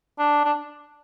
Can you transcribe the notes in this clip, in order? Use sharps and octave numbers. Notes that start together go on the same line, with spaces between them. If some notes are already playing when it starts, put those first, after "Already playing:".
D4
D4